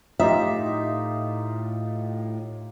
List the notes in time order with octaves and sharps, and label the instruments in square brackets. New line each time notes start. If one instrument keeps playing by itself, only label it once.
[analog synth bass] A2 [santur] D#4 F4 G4 [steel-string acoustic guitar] E5